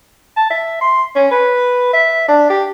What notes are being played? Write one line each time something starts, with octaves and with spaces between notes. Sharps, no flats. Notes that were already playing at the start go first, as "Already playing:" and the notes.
A5
E5
C6
C#4
B4
E5
D4
G4